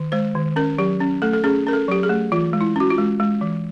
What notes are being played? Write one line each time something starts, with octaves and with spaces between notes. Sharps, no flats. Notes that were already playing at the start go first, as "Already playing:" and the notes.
Already playing: D#3
G#3 C5
D#3
C#4 A#4
F#3 G4
C#4
A3 A4
A4
C#4 G#4
C#4 A#4
A4
F#3 G4
G#4
A3
E3 F4
G#3
E4
C#4 F#4
F4
G#3
G#3
E3